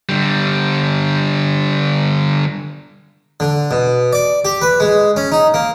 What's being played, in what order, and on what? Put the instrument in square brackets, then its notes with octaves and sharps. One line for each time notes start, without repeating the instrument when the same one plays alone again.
[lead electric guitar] D3 G3
[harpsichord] D3
B2
D5
G4
B4
G#3
C#4
D#4
A#3